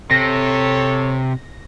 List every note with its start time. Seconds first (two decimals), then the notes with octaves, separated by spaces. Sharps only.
0.11 C3 A4 C#5 A#6